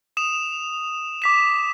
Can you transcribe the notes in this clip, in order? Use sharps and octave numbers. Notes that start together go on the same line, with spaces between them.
D#6 E7 F7
D6 B6 E7